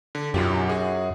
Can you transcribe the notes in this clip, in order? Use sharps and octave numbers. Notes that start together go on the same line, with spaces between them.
D3
B1 F#2 F4 G4
F#4 G#4